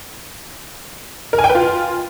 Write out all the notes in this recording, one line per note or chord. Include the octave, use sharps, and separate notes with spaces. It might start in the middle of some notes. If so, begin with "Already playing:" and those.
A#4
G#5
G5
B4
F4